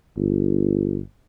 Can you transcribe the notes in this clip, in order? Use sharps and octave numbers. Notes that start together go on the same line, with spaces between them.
G1